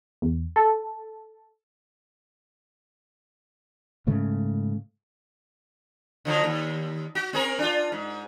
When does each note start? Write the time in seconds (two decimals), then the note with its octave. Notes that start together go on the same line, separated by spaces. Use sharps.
0.22 E2
0.56 A4
4.07 G#2 C#3 A3
6.25 D3 F3 F#3
6.44 D#2
7.15 F#4
7.33 C4 G#4 A#4
7.59 D4 F4
7.92 G#2